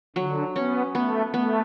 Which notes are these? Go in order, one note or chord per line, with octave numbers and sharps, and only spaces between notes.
D3 F#3
B3 C#4
A3 B3
A3 B3